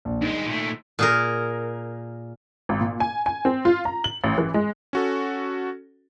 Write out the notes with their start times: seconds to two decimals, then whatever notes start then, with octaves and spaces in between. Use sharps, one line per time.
0.05 A#1
0.21 G2 D#3 G#3
0.46 A#2 A3
0.99 A#2 G#4 A#4
2.69 G#1
2.81 A#2
3.00 G#5
3.26 G#5
3.45 C4
3.65 F4
3.85 A#5
4.04 F#7
4.24 A1
4.38 E3
4.54 G#3
4.93 C#4 F#4 A4